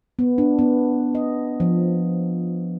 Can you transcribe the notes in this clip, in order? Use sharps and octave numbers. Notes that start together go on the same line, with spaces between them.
B3
D4
B3
D#5
F3